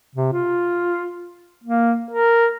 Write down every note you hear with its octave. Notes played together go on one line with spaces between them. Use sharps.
C3
F4
A#3
A#4